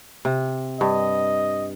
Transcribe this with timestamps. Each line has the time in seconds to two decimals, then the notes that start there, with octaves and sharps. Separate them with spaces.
0.25 C3
0.81 G2 D#5